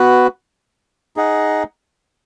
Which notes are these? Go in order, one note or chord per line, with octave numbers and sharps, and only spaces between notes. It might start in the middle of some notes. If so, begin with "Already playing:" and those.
Already playing: B3 F#4 B4
D#4 G#4 D#5 F#5